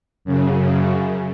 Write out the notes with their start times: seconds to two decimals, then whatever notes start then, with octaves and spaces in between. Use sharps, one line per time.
0.25 F#2 C#3